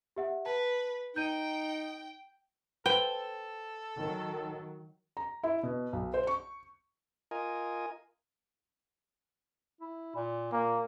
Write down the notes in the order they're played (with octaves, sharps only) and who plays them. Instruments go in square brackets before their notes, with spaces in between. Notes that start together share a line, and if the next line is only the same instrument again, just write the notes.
[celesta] G4 E5 F#5
[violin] B4 [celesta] A5
[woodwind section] D#4 [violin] G5 [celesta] G6 D#7
[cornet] A4 [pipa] B4 C5 [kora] G5
[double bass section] D#3 F#3
[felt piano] A#5
E4
B2
B1
C5
C#6
[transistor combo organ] F4 A#4 D#5 G#5
[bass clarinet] E4
A#2
[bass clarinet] A#2 [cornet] A#3